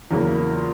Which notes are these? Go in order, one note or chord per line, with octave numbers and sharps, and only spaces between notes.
E2 C#3 F#3 A#3 E4
E4
E4
F4